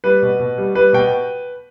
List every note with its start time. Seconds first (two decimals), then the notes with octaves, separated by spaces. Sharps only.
0.04 G3 B4
0.22 B2
0.39 B2
0.58 G3
0.75 G3 B4
0.93 B2 G5